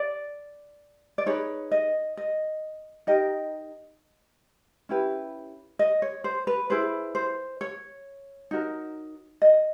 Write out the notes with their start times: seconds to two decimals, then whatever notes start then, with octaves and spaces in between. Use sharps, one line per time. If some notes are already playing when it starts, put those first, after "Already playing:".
Already playing: D5
1.18 D5
1.26 D#4 G#4 B4 C#5
1.71 D#5
2.17 D#5
3.07 D#4 G4 A#4 D#5
4.89 C#4 E4 G4 B4
5.79 D#5
6.02 C#5
6.24 C5
6.47 B4
6.70 E4 G#4 B4 C5
7.15 C5
7.61 C#5
8.51 D#4 F#4 A#4
9.42 D#5